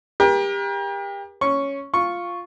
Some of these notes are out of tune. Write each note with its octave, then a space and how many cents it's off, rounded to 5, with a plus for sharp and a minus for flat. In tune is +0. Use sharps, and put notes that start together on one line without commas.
G4 +30 A#4 +40
C#4 +0 C#6 +0
F4 +0 C#6 -5